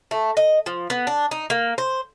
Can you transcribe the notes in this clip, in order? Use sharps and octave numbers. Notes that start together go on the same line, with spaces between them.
A3
D#5
F3
B3
D4
D#4
A#3
C5